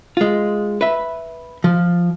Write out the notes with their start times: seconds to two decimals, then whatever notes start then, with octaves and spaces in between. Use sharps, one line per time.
0.17 G#3 F4
0.81 B4 E5
1.64 F3